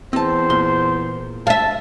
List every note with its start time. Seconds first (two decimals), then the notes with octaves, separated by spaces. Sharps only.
0.13 E2 C4 C5 A5
0.50 A#2 C6
1.47 E5 F5 A5